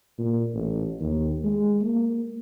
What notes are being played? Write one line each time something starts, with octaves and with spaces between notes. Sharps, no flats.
A#2
A1
D#2
G#3
A#3